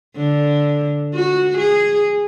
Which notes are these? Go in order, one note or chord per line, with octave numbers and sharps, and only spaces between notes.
D3
F#4
G#4